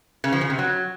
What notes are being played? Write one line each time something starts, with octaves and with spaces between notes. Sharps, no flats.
C#3
F3
C#3
C3
F#3